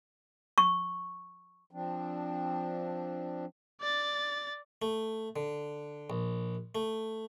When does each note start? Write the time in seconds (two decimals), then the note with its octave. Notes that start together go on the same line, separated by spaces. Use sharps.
0.58 C#6
1.71 F3 C4 D4
3.81 D5 A6
4.82 A3
5.36 D3
6.10 A#1
6.75 A3